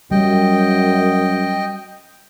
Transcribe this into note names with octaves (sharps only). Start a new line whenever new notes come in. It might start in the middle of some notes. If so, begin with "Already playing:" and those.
F#2 G3 D#5 G5